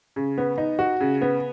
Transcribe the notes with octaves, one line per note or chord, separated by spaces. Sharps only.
C#3
B3
D#4
F#4
C#3
B3